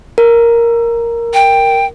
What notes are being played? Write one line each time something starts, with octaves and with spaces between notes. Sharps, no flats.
A#4
G5